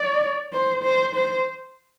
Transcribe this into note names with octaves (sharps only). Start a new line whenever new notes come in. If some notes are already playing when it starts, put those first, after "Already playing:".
Already playing: D5
C5
C5
C5